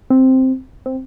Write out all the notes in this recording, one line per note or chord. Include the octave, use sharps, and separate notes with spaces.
C4
C4